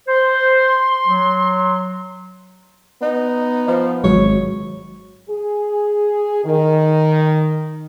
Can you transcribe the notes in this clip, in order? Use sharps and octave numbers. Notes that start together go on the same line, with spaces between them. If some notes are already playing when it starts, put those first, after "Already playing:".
C5 C6
F#3
B3 D#4
F3
G#1 F#3 G#3 C#5
G#4
D#3